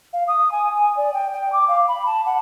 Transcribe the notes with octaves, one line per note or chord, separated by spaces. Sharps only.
F5
D#6
G#5
G#5
D5
G5
G5
D6
F5
B5
A5
F#5